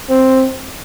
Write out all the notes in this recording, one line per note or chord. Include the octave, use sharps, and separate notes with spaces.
C4